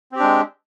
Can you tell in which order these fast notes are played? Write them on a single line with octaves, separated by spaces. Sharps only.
C4 G4 D4 G#3